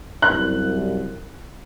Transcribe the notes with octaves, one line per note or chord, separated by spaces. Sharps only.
C2 F#2 F#6